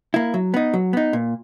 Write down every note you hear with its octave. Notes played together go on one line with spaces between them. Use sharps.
A#3 E4
F#3
B3 D#4
F#3
B3 D#4
A#2